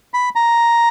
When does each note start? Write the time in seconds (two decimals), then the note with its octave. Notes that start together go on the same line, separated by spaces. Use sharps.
0.14 B5
0.35 A#5